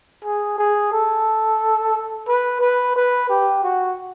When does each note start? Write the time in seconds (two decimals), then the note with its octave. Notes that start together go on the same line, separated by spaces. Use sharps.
0.24 G#4
0.58 G#4
0.93 A4
2.28 B4
2.61 B4
2.96 B4
3.29 G4
3.63 F#4